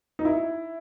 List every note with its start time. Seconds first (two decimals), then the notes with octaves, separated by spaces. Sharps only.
0.19 D#4
0.25 E4